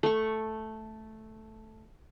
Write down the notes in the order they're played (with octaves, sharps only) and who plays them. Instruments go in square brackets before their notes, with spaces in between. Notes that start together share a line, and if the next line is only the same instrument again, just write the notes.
[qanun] A3 C#6